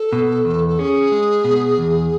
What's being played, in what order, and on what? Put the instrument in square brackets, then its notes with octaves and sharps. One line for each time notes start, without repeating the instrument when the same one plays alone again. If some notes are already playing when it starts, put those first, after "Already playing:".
Already playing: [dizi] A4
[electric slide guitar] B2
E2
[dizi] A4
[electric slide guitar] C#4 [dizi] G#4
[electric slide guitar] G#3
B2
E2